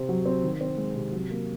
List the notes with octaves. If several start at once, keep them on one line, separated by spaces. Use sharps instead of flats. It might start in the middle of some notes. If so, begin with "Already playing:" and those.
Already playing: C3 C4
F#3
C4
D#3
C4
G#3
C3
F#3
A#3